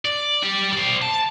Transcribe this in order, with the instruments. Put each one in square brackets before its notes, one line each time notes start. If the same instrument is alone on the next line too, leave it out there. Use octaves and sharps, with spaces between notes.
[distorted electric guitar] D5
G4 D5
C5 D5
A5